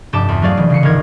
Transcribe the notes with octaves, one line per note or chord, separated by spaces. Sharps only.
F1 G2 G4 A5 D6 E7
E2
F#3 A3 G#4 D5 F5
F1 E3
C#3 C7 C#7
G#1 D2 A#4 G#6